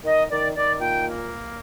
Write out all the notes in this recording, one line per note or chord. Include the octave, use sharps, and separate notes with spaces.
D#3 D#5
D#3 D5
D#3 D5
A#2 G5
A#3